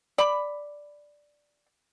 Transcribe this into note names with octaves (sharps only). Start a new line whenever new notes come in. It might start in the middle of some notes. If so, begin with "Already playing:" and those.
D5 B5